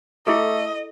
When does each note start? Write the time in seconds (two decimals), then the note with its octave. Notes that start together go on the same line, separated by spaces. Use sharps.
0.27 A3 E4 G#4 A4 D#5